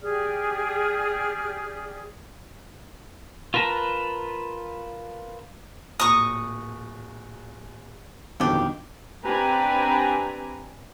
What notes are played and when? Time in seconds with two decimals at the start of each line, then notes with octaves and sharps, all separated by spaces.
0.01 G4 G#4 D5 F6
3.54 F4 A#4 B4 A5 A#5
6.00 D1 A#2 A#5 C#6 D#6
8.40 G1 F2 B2 D#3 F3 G4
9.24 C4 D4 G4 B4 G#5 A#5